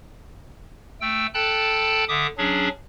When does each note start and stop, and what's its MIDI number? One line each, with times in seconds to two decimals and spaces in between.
1.01 1.26 57
1.01 1.26 79
1.01 1.26 88
1.34 2.04 69
1.34 2.04 79
1.34 2.04 81
1.34 2.04 83
1.34 2.04 90
2.09 2.27 50
2.09 2.27 76
2.09 2.27 86
2.09 2.27 87
2.38 2.69 54
2.38 2.69 61
2.38 2.69 62
2.38 2.69 68